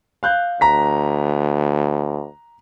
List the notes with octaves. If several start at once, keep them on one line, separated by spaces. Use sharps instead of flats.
F5 F#6 G6
D2 A#5 B6